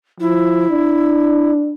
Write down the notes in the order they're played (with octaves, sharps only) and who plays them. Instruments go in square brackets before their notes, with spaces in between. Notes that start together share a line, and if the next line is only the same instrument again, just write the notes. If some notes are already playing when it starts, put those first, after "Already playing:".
[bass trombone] F3 [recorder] E4
[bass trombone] D4